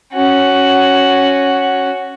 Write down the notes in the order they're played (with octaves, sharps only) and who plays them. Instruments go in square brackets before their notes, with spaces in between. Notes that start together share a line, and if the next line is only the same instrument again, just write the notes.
[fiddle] C#4 F#4